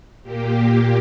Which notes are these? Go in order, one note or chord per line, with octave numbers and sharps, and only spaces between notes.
A#2 A#3 G4